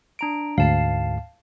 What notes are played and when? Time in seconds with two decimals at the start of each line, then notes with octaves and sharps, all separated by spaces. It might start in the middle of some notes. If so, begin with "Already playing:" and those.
0.19 D4 A#5 D7
0.58 D2 G#2 F5 A5 C7